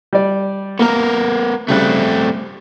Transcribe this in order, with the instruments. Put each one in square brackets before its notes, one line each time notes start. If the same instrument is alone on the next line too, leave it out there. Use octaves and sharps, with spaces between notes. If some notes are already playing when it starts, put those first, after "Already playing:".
[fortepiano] G3 D5
[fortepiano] A#3 [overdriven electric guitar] B3 A#4
[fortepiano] C#3 G3 F#6 [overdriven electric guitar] A3 C4